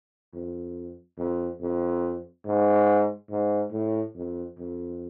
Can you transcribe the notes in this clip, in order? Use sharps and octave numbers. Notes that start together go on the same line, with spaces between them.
F2
F2
F2
G#2
G#2
A2
F2
F2